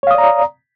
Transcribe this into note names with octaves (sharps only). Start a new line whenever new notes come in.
C#5 D5 F5 A#5 D#6